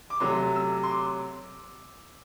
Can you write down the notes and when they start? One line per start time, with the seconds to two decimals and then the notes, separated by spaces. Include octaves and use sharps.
0.10 D6
0.20 C3 F#3 A3 C6
0.56 E6
0.83 C6
0.90 D6